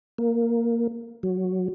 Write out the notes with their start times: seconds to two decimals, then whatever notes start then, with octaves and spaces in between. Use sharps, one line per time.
0.18 A#3
1.23 F#3